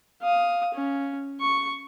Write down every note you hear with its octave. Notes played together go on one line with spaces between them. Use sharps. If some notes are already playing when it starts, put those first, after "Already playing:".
F5 D#6
C#4
C#6